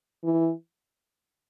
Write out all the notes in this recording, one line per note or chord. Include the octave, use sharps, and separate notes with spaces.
E3